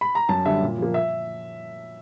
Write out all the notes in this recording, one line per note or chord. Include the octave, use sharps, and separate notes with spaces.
B5
A#5
F#2 A5
D3 G3 E5
A#2
F3 A#3
E5